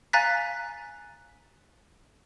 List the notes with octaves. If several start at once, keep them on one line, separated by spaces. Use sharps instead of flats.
F5 G#5 A#5 F#6 A6 B6